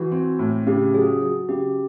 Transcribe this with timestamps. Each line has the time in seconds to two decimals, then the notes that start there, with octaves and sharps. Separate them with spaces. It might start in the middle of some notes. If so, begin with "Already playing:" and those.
Already playing: E3 F#4
0.12 C4
0.39 A2
0.66 C#3 G4
0.94 F#3 G#4
1.22 F#3
1.49 C#3 G4